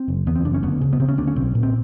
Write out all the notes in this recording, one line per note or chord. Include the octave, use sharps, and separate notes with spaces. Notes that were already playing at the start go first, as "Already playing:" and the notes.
Already playing: C4
F#1
E2 B3
C4
F#1 D4
C#4
D2 B3
C#3
B3
C#3 C4
C#4
D2 D4
C#4
B1 C4
A#2
C4